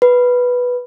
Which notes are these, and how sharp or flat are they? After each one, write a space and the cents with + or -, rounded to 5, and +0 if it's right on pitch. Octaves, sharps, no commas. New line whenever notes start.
B4 -5